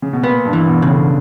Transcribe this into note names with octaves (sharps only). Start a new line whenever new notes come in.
C#3
B2
A#2 B3
G2
E3
B2
C#3
D3